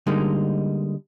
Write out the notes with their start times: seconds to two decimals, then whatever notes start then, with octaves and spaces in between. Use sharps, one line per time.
0.07 D3 G3 G#3 A#3 D#4